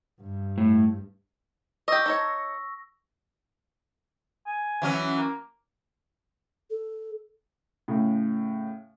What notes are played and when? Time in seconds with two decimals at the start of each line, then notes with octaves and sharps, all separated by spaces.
0.22 G2
0.58 A2
1.88 G4 D#5 C#6 E6 A#6
2.06 D#4 A4 C#5
4.46 G#5
4.82 E3 F#3 C#4
5.17 A#3
6.70 A4
7.88 A2 C#3